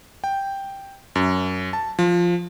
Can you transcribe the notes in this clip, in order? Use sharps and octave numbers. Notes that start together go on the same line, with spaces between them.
G5
F#2
A5
F3